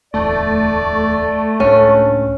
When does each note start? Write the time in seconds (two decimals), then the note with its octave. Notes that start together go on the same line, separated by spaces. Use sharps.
0.14 D1 E2 A3 D5
1.60 C#2 A2 C#4 D4